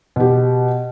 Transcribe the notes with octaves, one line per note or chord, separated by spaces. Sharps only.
B2 G4